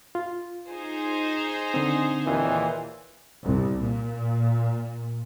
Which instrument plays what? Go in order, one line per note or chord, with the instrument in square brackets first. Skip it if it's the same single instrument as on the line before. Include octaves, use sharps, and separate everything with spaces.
[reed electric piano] F4
[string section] D#4 G#4 C5
[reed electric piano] D3 C4
[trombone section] D#2 A#2 E3
[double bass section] C2
A#2